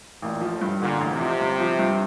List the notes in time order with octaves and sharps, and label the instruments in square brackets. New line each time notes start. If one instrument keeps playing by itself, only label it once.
[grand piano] A1 [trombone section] A#2
[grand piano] F3
[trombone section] A2
[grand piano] G2
[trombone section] A#2 [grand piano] D3
[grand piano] A1
[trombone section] C3
[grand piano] F3
G1
F3
G2